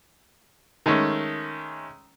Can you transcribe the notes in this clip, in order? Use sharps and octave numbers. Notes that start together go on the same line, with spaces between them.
D#3 G#3 A3 C#4